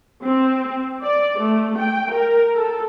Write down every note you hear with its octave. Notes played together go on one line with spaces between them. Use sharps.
C4
D5
A3
G5
A#4
A4